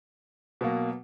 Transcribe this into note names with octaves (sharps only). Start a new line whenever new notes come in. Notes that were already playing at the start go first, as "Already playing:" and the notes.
B2 F#3 A#3